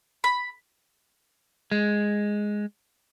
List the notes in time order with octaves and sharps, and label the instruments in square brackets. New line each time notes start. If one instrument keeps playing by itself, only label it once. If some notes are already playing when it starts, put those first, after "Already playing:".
[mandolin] B5
[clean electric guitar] G#3